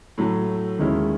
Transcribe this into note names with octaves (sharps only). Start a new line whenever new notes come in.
A2 F#3 A3
D#2 D#3 G#3 C#4 E4